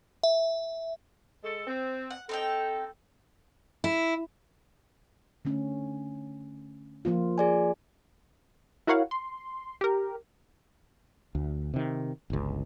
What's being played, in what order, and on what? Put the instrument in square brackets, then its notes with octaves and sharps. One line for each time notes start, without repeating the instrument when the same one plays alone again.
[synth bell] E5
[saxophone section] G#3 A4
C4
[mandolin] F#5
[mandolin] C4 D#4 G5 [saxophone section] A4
[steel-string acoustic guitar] E4
[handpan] D3 A3 C#4
F3 A#3 F4
[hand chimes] G#4 D5 G#5
[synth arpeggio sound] E4 F#4 A#4 C#5 F5 F#5
C6
G4 A#4
[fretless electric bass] D2
C3 D#3
G1 C#2